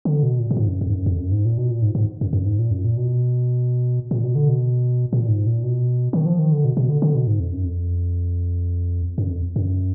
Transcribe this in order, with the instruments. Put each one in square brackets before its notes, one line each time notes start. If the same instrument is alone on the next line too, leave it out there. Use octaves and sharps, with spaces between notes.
[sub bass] D3
B2
A#2
A#2
G#2
F#2
F2
G#2
F#2
F2
F#2
G#2
A#2
B2
A#2
G#2
G#2
F#2
F#2
G#2
A#2
F#2
A#2
B2
A#2
B2
D3
B2
A#2
G#2
A#2
B2
D#3
F3
D#3
D3
B2
B2
D3
D3
B2
G#2
F2
F#2
F2
F#2
F2
F#2